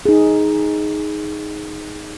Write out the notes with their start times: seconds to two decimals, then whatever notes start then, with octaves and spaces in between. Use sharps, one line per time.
0.06 D#4 G#4